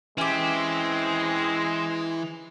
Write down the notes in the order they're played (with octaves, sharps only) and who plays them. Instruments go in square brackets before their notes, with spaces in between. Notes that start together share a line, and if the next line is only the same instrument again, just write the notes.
[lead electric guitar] E3 E4 [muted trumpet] G#3 [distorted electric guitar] C4 [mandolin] C#4 G4